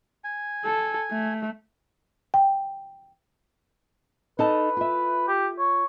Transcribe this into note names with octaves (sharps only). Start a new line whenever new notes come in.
G#5
A4
A3
G5
D#4 A4 B4 A5
F4 E5
G4
C#5